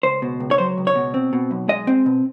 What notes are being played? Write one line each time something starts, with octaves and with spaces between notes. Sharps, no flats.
C#2 C5
B2
C#2
C#5
F#3 C5
C#2
C#5
B2
C4
B2
B1
G#3 D#5
C4
B2